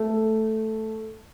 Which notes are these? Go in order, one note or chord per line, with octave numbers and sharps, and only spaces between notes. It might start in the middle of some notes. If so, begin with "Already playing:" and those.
Already playing: A3